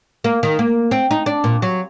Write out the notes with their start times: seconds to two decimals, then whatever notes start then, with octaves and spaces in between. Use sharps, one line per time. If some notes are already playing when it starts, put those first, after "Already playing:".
0.24 A#3
0.43 D#3
0.59 A#3
0.91 C4
1.11 D#4
1.26 D4
1.44 A#2
1.62 F#3